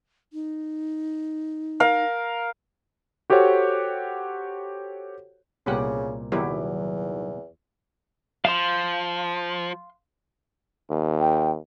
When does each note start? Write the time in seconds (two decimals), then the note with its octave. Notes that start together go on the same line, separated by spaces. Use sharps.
0.33 D#4
1.80 A#4 F5
3.30 F#4 G4 A4 C5 C#5 F#5
5.66 C2 A#2 C#3 B3 G4 F#5
6.32 E2 D#3 F#3 B3 E4 G4
8.45 F3 F5 C6
10.90 D#2
11.20 G5